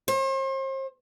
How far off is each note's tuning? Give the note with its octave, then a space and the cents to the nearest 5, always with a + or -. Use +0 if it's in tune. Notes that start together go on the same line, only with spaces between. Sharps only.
C5 +40